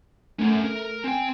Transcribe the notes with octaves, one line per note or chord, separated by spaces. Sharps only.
A3 C#4 A#4
A#4
C4 G5 G#5